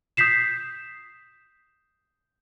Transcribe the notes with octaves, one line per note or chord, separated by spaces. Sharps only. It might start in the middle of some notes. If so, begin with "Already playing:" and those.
D#6 G6 B6 C7 E7